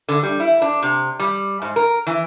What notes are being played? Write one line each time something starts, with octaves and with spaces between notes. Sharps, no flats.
D3
G3
E4
D4
C3
G3
G#2
A#4
E3